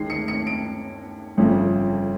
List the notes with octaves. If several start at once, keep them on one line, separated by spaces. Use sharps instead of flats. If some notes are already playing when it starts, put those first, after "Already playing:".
Already playing: D#2 D#3 G#3 C7
C#7
C#7
D7
G1 F2 C#3 F3